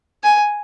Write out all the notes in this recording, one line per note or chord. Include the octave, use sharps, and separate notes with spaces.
G#5